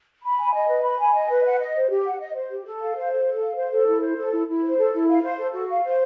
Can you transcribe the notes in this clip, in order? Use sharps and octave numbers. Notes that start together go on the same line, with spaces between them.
B5
G#5
D#5
B4
B5
G#5
D#5
B4
F#5
D#5
C5
G4
F#5
D#5
C5
G4
A4
F5
C5
A4
A4
F5
C5
A4
E4
C5
A4
E4
E4
C5
A4
E4
F5
C5
A4
F#4
F5
C5